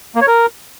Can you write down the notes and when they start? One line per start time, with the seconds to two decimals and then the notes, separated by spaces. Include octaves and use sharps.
0.15 A#3
0.21 C#5
0.27 A#4